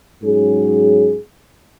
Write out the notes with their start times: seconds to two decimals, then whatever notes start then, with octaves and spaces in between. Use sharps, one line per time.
0.21 G#2 F#3 C#4 G#4